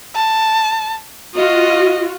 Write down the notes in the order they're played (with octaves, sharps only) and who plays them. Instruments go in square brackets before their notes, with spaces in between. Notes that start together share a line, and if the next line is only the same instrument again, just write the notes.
[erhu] A5
[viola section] F4 F#4 [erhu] D#5